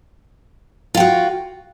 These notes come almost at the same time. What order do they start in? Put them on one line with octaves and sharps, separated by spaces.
F4 G5 F#4